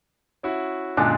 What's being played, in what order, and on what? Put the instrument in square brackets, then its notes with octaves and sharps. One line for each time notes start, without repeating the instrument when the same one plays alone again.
[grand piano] C#4 E4 F#4
[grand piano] F#2 A#2 D3 [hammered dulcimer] G#3 D4